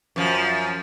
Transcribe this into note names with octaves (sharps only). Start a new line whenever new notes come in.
F#2 F3